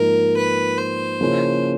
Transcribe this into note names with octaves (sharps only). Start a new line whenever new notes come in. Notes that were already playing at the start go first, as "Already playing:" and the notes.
Already playing: G#2 F3 A#3 D#4 A#4
B4
C5
C#3 F3 A#3 C#4 E4